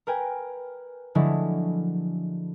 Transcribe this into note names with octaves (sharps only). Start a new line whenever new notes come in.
A#4 B4 G5 G#5
D3 F3 F#3 G#3 A3 E4